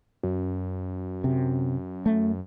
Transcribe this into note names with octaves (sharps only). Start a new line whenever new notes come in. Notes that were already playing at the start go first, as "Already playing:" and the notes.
F#2
C3
A3